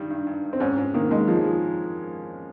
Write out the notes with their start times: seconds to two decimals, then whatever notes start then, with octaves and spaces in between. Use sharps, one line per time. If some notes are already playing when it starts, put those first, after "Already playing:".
Already playing: G2 D#3 G3 D#4
0.10 G2
0.27 G2
0.44 G2
0.53 C4
0.60 G#2 C#4
0.78 G#2
0.94 D#3 A#3
1.11 D#3 G#3
1.28 F3 G#3
1.44 G#3